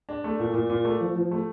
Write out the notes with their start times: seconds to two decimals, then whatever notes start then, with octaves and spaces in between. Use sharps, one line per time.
0.09 D4
0.24 A3
0.39 A#2
0.54 A#2
0.70 A#2
0.85 A3
1.00 F3
1.16 F3
1.31 A3